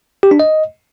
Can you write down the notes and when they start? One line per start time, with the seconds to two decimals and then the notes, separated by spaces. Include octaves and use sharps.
0.23 G4
0.31 D4
0.40 D#5